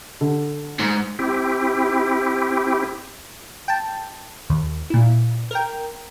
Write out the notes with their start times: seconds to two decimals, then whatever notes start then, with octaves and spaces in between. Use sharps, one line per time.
0.21 D3
0.80 G#2
1.19 C4 E4 G4
3.68 G5 A5
4.50 D#2
4.90 A#2 E4
5.51 A#4 G5